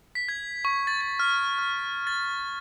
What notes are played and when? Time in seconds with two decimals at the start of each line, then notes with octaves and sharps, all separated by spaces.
0.15 B6
0.29 G#6
0.65 C#6
0.87 A6
1.01 A6
1.20 F6
1.58 F6
2.07 A6